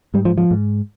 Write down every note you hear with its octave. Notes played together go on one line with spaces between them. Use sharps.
G#2 G3
F3
F3
G#2